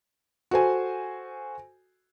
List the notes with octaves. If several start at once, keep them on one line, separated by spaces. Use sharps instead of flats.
F#4 A4 C5 G#5